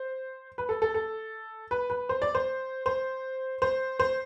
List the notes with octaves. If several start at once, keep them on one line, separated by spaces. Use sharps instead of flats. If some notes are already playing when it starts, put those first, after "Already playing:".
Already playing: C5
B4
A4
A4
A4
B4
B4
C5
D5
C5
C5
C5
C5